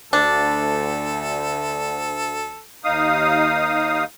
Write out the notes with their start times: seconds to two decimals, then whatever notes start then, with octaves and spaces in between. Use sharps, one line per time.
0.13 D2 D4 A4
2.84 D#2 D#4 F5 D#6